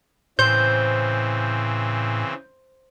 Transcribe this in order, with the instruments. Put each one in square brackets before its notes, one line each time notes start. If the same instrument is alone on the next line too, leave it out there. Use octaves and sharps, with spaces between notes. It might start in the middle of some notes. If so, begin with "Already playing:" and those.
[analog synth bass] A2 [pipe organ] C#3 E3 C4 [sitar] C5 [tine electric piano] G6